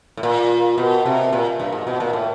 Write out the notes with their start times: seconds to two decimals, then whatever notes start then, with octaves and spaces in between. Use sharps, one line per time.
0.17 A2
0.23 A#2
0.78 B2
1.06 C3
1.33 A#2
1.60 G2
1.72 G#2
1.87 B2
2.00 A#2
2.13 A2